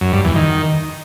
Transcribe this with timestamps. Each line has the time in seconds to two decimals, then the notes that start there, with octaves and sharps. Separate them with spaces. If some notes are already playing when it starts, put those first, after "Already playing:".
0.01 F#2
0.13 G2
0.24 E2
0.36 D#3